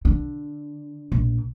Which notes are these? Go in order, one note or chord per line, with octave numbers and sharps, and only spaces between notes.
D3
A#1